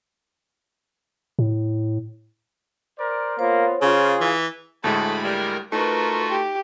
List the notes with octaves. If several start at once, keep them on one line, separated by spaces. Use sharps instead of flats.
A2
A#4 C5 D5
A#3 B3 F4 C5 C#5
C#3 F4 G#4
E3
D2 A2 G#3 A3 B5
G3 A#4
A3 D#4 F4 F#4 A#4 B4
G4